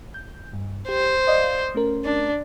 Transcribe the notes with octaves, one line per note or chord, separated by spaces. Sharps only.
G6
G2
G4 C5
D5 D#5 F5
A3 C#4 A#4
D4